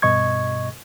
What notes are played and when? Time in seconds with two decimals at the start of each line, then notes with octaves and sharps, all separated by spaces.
0.02 G2 B2 D#5 C#6 G#6